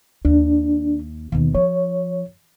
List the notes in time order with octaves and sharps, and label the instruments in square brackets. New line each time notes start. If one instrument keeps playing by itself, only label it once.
[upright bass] D#2 [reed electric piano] D4
[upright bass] D#2 B2 [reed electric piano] D#3
[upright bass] F3 [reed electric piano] C#5